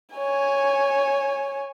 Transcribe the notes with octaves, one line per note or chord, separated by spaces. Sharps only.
C#5 G#5